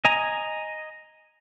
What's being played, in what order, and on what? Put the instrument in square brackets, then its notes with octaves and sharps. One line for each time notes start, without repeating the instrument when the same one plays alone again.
[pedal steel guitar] D#5 G#5 A#5